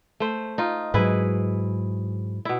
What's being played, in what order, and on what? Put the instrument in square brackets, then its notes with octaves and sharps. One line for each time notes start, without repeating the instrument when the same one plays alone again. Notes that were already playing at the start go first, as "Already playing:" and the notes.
[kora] A3 C5
D#4 F4
[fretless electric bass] G#2 F#3 [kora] E4 G#4 B4
[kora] B2 E4